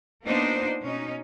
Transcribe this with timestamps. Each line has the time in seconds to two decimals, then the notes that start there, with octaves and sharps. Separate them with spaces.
0.23 A#3 B3 D4 D#4 F4 C5
0.82 B2 C#4 D#4